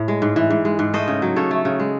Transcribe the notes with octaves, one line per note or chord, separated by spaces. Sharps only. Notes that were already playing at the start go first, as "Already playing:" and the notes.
Already playing: A2
G#3
G#2
E3
G#2
G#3
G#2
A3 C5 D#5
C#3
F#3
C#3 A4 C#5
A3
C#3
G#3